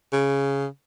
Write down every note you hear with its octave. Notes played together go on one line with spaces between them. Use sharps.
C#3